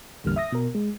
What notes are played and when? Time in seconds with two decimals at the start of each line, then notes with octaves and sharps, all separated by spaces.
0.24 A1 E2 D3 G3 A#3 F6
0.36 E5 D#6 A#6
0.52 B2 A#4
0.75 G#3